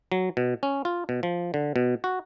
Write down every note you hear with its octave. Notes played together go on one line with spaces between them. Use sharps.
F#3
B2
C#4
F4
B2
F3
D3
B2
F#4